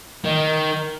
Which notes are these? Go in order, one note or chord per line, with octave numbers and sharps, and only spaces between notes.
D#3